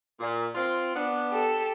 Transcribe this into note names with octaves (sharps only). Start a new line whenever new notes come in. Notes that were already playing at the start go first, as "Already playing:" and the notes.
A#2
C4 F4
B3 D4
G4 A4